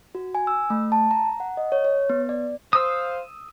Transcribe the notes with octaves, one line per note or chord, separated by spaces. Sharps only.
F#4
G#5
E6
A3
A5
A#5
F#5
D#5
C#5
C#5
B3
D5
C5 F5 D#6 E6